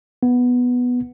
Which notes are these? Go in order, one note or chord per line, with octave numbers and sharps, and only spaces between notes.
B3